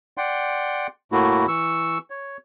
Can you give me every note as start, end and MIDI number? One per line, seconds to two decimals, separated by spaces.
0.18 0.87 74
0.18 0.87 78
0.18 0.87 79
0.18 0.87 84
1.12 1.46 45
1.12 1.46 57
1.12 1.46 58
1.12 1.46 64
1.12 1.46 66
1.48 1.98 52
1.48 1.98 85
1.48 1.98 88
2.10 2.37 73